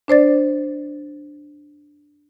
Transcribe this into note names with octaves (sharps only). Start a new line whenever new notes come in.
D4 C5 D5 A6